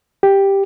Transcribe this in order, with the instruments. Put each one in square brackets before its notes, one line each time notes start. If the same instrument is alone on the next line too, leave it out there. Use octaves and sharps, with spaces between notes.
[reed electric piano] G4